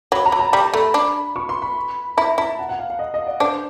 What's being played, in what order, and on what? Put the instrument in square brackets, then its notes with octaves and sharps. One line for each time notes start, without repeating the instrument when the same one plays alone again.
[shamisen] F#3 [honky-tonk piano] B5
[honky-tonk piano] A#5
[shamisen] F#3
[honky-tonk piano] A5
[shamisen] G3 [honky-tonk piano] A#5
[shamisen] A3 [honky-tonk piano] B5
[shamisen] D4
[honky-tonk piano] C#6
C6
B5
[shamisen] E4 [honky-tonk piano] A#5
[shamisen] E4 [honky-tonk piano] A5
[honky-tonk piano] F#5
F#5
F5
F5
D#5
D#5
D5
[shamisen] D4 [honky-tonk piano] C5